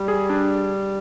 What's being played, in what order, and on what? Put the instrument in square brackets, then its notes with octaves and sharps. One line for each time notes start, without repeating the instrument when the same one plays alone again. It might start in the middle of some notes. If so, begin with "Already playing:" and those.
Already playing: [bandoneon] G3
[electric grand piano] G#4
D4